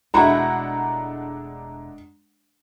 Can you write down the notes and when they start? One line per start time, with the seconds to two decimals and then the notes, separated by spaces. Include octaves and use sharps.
0.14 E1 G#3 A3 D4 E4 F#4 F#5 A#5